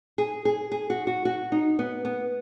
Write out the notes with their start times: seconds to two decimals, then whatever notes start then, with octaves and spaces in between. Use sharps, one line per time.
0.18 G#4
0.45 G#4
0.72 G#4
0.90 F#4
1.07 F#4
1.25 F#4
1.52 D#4
1.79 B3
2.05 B3